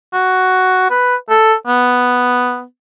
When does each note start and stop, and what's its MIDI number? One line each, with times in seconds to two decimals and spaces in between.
0.13 0.89 66
0.90 1.16 71
1.30 1.54 69
1.67 2.63 59